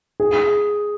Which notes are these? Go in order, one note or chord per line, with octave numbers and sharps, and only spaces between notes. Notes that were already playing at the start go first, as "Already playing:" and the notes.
G#4